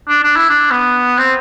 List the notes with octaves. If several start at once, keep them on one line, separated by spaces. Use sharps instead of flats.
D4
D4
E4
D4
B3
C4